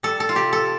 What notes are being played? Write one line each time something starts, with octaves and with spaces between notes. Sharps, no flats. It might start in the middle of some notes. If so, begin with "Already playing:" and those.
G3 A4
A4
F4
C3 G4
A4